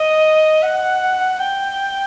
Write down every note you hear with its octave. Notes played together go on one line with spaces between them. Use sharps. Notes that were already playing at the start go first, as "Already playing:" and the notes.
Already playing: D#5
F#5
G5